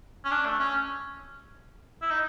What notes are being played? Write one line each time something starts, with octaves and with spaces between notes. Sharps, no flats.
C#4
D4
A3
C#4
E4
D#4